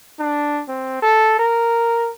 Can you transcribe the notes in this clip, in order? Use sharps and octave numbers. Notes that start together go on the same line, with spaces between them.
D4
C4
A4
A#4